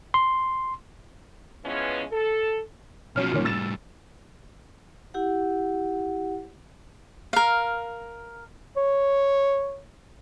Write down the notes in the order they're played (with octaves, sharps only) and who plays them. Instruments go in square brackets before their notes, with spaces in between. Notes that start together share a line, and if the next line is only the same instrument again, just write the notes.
[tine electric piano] C6
[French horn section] E3 F3 G#3 B3 C#4
A4
[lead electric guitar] B2 F3 [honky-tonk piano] F#3 C#4 F6
[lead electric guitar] F#2 G3 [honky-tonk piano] A#2 D#3 C#4
[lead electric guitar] A2 G3 [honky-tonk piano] E6 A6 E7
[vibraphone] E4 G4 F#5
[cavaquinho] A#4 F5
[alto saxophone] C#5